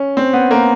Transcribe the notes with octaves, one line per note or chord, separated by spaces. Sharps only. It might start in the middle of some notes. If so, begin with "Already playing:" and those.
Already playing: C#4
C4
B3
A#3